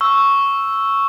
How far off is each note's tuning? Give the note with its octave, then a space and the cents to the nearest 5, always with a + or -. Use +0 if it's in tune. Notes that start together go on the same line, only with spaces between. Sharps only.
C#6 +0 E6 +0